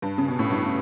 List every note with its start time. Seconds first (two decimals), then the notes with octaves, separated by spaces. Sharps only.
0.02 G2
0.18 C#3
0.28 B2
0.39 A2
0.50 G2